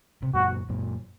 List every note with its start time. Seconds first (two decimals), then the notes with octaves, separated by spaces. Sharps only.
0.23 C3
0.34 F#2 A#2 F#4
0.69 F#2 A#2